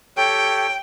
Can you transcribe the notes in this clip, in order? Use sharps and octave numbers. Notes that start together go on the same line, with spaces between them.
G4 A4 C#5 G5